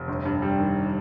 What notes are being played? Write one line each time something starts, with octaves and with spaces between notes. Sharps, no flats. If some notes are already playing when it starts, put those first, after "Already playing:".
Already playing: F1
G1
G2
G3
D#3